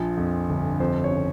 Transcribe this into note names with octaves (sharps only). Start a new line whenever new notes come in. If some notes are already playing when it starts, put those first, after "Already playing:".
Already playing: A#1 A#2 F3
F2
G1
F2 C5
C#5
C#3